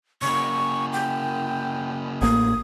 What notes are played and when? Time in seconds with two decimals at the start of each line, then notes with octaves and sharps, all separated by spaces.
0.22 C#3 A#3 C#6
0.93 G5
2.22 A1 A#3 D#6